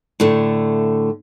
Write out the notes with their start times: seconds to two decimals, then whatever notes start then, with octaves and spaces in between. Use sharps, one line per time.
0.20 A2 D3 A3